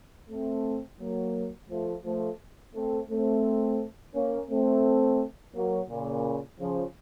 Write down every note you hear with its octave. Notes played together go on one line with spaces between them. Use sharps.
A3 C4
F#3 A#3
F3 A3
F3 A3
A3 C4
A3 C4
A#3 C#4
A3 C4
F#3 A#3
A#2 C#3
C#3 F3